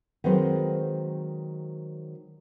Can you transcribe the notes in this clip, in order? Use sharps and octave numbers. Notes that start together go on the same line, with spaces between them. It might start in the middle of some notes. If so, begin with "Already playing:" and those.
D#3 F#3 G#3 C4 B4 C5